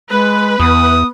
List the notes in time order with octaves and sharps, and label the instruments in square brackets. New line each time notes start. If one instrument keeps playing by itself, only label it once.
[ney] G#3 [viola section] B4
[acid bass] E2 [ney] B3 [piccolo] D#6